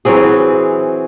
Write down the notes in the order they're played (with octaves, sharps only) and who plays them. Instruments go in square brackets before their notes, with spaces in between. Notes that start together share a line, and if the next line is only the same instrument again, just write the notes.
[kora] E3 F#3 C4 G#4